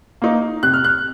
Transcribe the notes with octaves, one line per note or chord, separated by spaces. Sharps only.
A#3 D#4
C3 F#6
F6
F#6